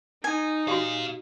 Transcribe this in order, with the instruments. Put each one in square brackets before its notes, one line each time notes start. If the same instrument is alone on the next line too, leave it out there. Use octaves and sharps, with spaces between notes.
[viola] D#4 [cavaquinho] G#5
[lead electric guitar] A#2 F5 [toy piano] F#4 G4